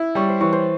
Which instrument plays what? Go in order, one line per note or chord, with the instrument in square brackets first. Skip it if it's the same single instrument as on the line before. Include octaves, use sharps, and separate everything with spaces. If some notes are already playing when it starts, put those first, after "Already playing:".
Already playing: [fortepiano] E4
[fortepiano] G3 [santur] C#5
[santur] C5
[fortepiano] E3 [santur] C#5
[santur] C5